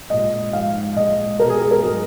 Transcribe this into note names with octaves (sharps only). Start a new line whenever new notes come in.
A#2 G#3 D#5
G#2 F3 G#3 F5
A#2 G#3 D#5
B2 G#3 A#4
G#4
G#4
A#4
G#2 F#3